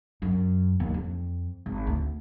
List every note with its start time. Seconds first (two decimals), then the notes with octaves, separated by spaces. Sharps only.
0.22 F#2
0.80 D#2
0.94 F2
1.66 G#1
1.87 D2